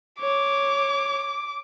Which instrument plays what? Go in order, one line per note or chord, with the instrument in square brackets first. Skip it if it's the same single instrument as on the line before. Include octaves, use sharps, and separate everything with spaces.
[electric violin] C#5 [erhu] D6